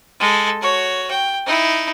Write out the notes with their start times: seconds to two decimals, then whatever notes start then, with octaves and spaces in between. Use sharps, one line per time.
0.20 G#3 A4
0.61 F#4 C#5
1.11 G5
1.46 D#4 E4